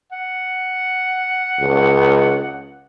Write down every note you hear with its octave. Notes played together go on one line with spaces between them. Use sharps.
F#5
C#2